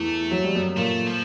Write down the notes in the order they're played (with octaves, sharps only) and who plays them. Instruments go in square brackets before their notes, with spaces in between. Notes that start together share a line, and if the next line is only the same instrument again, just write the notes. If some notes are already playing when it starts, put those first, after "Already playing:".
Already playing: [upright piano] E2 E3 [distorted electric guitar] A3
[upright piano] F#3
G3
F#2 F#3
[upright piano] A#2 A#3 [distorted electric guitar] A3
[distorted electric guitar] F3